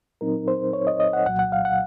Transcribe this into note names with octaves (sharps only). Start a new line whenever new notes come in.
A#2 F#3 C4 D#4 A#4
C5
C#5
D#5
D#5
F#5
C2 A#2 F#3 F#5
F#5
F5
F#5